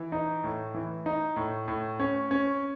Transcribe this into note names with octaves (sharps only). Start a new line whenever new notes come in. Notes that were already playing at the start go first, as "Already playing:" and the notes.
Already playing: E3
D#4
A2
E3
D#4
A2
A2
C#4
C#4